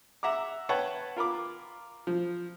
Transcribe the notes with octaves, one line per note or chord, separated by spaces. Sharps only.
E5 F#5 A#5 D6
B4 C#5 F#5 G5 A5 C#6
F4 A#4 B5 D6
F3